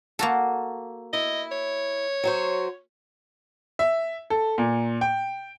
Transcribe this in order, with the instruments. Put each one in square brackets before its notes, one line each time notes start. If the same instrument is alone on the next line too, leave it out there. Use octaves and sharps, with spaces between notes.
[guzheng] A#3 F#4 A4
[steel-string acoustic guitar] E4 [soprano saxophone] D#5
[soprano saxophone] C#5
[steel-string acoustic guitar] F#3 F#4 C5
[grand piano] E5
A4
A#2
G5